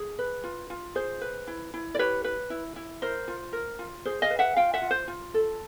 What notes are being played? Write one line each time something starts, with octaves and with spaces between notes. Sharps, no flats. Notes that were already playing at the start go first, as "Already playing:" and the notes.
Already playing: G#4
B4
F4
F4
G#4 C5
B4
E4
E4
D5
G4 B4 C#5
B4
E4
E4
A#4 C5
F4
A#4
F4
G#4 C5
D#5 F5
B4
E5 F#5
F4 F5 G5
E5 F#5
F4
C5
F4
A4